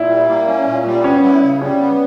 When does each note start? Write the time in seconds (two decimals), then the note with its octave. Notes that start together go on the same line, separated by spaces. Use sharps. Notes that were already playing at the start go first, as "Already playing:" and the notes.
Already playing: A#2 E4
0.09 G3
0.28 A#3
0.47 C#4
0.66 A#2
0.85 G3
1.04 B3 C#4
1.24 E4
1.42 C#3
1.61 G3 C#4
1.80 B3